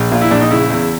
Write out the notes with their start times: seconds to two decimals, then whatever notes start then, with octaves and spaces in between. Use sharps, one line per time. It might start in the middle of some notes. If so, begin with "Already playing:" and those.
Already playing: A#1
0.11 A#2 F4
0.22 E4
0.31 A#1 D4
0.41 D#4
0.51 C#3 E4
0.70 E2